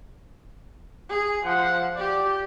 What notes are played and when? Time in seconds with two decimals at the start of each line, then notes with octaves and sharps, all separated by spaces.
1.09 G#4
1.46 F3 F#5
1.97 G4 D5